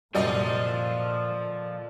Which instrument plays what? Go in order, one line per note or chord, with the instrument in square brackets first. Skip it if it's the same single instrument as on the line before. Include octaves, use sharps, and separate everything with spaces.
[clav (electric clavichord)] C2 F#2 G3 [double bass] A#2 [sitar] D3 D5 D#5 [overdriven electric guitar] F3